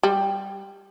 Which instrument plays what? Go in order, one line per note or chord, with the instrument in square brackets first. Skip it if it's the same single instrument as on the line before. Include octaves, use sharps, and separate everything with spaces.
[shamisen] G3